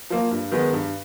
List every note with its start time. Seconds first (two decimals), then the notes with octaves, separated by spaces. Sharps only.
0.10 F3 A#3
0.31 G2
0.52 D#3 G#3 B3
0.73 G2